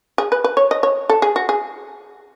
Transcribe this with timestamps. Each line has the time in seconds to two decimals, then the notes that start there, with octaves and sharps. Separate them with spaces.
0.18 G#4
0.32 B4
0.44 B4
0.57 C#5
0.71 D#5
0.83 C#5
1.09 A4
1.22 G#4
1.36 F#4
1.49 G#4